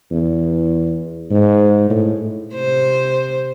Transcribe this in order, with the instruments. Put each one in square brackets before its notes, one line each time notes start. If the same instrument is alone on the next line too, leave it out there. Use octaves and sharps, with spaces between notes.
[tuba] E2
G#2
A2
[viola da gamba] C3 C5